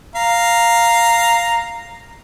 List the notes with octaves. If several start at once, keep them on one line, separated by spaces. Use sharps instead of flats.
F5 A#5